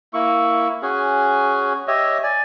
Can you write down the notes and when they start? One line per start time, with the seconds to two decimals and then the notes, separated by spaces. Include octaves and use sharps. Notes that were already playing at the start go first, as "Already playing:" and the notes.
0.14 A#3 E4 C#6
0.82 C#4 F#4 G#4
1.88 G4 C#5 D#5 E5
2.23 D5 G#5